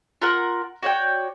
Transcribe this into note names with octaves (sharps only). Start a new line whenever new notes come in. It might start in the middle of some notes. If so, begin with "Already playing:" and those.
F4 A#4 F#5
F#4 C#5 D5 G5